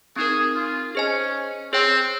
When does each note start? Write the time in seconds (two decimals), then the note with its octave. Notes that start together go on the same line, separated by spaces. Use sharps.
0.16 C4 D#4 G#4 A#4
0.55 F4
0.95 C#4 G#4 C5 D#5 G#5
1.73 C4 G#4 C#5 G5